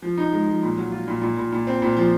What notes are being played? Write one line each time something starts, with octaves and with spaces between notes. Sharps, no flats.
F3
D#4
G#3
F3
A#2
F#3
F4
A#2
A#2
A#2
A#2
C4
A#2
F3